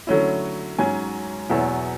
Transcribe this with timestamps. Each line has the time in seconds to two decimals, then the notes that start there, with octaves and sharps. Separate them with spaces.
0.07 D3 F#3 A3 C#4 E4
0.78 G#2 F#3 C#4 G#5
1.50 E2 B2 F#3 B3 E4